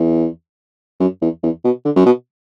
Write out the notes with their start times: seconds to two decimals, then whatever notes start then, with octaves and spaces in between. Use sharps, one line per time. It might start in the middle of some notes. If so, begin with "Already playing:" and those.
Already playing: E2
1.00 F#2
1.22 E2
1.43 E2
1.64 B2
1.85 D3
1.96 F#2
2.06 B2